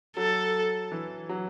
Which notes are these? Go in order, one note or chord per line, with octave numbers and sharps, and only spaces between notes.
F#3 A4
E3
F#3